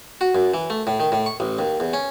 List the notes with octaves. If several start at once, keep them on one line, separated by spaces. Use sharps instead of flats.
F#4
F#2
E3
A3
A2
D#3
A2
C#6
A1
D#2
E2
C#4